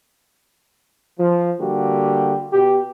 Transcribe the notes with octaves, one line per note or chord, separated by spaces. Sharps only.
F3
D3 G3 A#3 F#4 G4
B2 G4